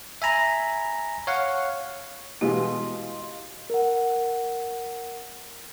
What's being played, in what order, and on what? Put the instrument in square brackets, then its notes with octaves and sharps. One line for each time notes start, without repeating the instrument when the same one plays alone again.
[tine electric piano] E5 G#5 A#5 B5
C#5 F5 F#5
[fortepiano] B2 E3 G#3 [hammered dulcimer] F4 D#5 [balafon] G4
[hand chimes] A#4 F#5